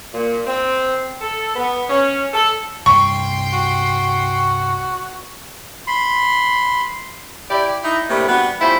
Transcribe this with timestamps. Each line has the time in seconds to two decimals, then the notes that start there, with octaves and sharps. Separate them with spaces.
0.14 A#2
0.46 C4
1.21 A4
1.55 B3
1.89 C#4
2.34 A4
2.86 C2 G2 G5 C6 C#6
3.53 F#4
5.87 B5 C6
7.51 E4 G4 D5
7.84 D#4 E4
8.10 A2 C3 G3 A3 A#3 D4
8.29 G3 B3 D4 F#4
8.61 G3 A3 C#4 E4 F4 C5